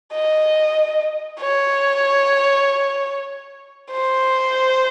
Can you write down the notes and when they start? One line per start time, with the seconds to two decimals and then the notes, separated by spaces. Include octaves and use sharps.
0.14 D#5
1.40 C#5
3.92 C5